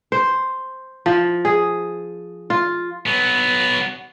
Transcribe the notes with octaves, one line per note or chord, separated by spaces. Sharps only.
C5
F3
G#4
F4
F#3 B3